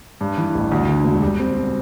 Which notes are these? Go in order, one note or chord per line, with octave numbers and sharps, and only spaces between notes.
G2
E3
A1
D2
D3
E1
G3
C4
B2